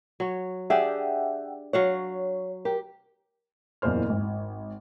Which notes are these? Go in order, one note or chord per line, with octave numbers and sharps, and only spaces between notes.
F#3 C#5
D4 G4 G#4 E5 F#5 G5
F#3 C#5 F5 F#5
G4 A#4
F#1 E2 A#2 C5 F6
G#1